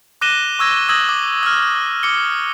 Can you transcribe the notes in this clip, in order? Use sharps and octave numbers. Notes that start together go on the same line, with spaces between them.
D6 F#6 A#6 D#7 E7 G7
C#6 E6 G#6 A#6
D#6 E6 G#6 A#6 F#7
D6
E6 F6
D6 E6 C#7 G7